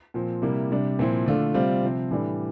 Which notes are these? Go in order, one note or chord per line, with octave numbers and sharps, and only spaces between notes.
A#2 F3 C4
C3 G3 A#3 E4
C3 G3 D4
A#2 F3 C4 E4
D3 A3 D4 F4
C3 G3 C4 F4
C3 F3 C4
A2 E3 G3 D4